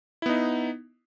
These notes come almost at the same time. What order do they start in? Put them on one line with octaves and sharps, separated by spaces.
E4 B3 D#4